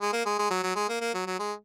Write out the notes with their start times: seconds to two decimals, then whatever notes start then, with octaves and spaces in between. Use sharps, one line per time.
0.01 G#3
0.13 A#3
0.26 G#3
0.39 G#3
0.51 F#3
0.63 F#3
0.76 G#3
0.89 A#3
1.01 A#3
1.14 F#3
1.27 F#3
1.39 G#3